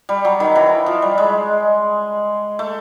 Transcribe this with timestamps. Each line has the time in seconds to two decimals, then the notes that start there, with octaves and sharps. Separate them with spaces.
0.09 G3
0.25 F#3
0.40 D#3
0.55 E3
0.86 F3
1.02 G3
1.18 G#3
2.59 A3